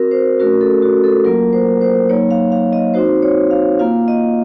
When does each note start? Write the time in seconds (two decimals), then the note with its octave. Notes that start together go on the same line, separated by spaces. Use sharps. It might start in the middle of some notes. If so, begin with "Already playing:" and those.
Already playing: C4 F#4 A#4
0.11 C5
0.40 A3 C#4 F#4 A#4
0.61 A4
0.82 F#4
1.04 A4
1.25 F#3 A#3 F4 A#4
1.53 C5
1.81 C5
2.09 F#3 A#3 D#4 C#5
2.31 F5
2.52 F5
2.73 D#5
2.94 C4 D#4 F#4 C5
3.23 C#5
3.51 F5
3.79 A#3 F4 F5
4.08 D#5